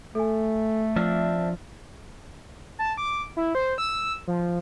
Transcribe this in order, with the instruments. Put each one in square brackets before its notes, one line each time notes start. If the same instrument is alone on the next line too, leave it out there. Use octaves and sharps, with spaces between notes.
[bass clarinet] A3 [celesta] A4 G#5
[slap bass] F3 [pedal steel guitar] C4 D4 E5 [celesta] F6
[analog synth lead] A5
D6
E4
C5
E6
F3